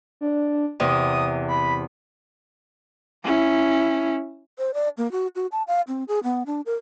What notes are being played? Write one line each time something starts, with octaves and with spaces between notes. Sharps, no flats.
D4
E2 C3 D#6
B5
C#4 E4
C5
D5
A#3
F#4
F#4
A5
F5
C4
G#4
B3
D4
A#4